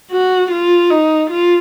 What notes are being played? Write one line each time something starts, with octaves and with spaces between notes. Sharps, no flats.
F#4
F4
D#4
F4